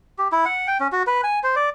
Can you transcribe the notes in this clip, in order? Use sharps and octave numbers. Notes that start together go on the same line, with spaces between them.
G4
E4
F#5
G5
C#4
F#4
B4
G#5
C5
D5